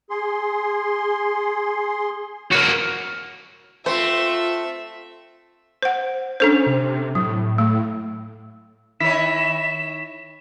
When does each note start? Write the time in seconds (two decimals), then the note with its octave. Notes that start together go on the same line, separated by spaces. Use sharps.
0.10 G#4 C6
2.51 A#3 F#4 C#5
3.86 A3 C4 F4 C5 E5
5.83 C5 F#5
6.40 C#4 D4 A4 C5
6.67 C3
7.15 A2 F#3
7.58 A3
9.00 D#3 E4 C#5 B6 E7